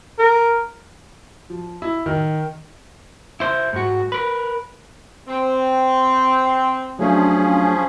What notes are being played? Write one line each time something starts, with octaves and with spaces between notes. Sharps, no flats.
A#4
F3
E4
D#3
E4 C5
G#2 F#4
A#4 B4
C4
F3 F#3 A3 C#4 D4 G#4